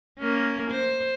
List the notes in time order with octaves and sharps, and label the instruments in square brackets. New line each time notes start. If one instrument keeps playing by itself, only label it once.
[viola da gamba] A#3 C#4
C5